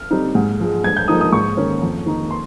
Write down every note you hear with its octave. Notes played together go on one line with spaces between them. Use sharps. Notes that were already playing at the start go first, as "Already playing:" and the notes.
Already playing: F6
G3 C4 D#4
G#2
F3 G#3
G2 G#6
G6
F3 A#3 D#4 D#6
D#6
G#2 C#6
D#3 A#3 C#4
F2
D#3 A#3 D#4
C6